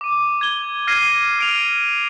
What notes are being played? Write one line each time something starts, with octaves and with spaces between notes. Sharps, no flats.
D6 D#7
G#6 G7
F6 G#6 A#6 C7 D#7
F6 D7 F7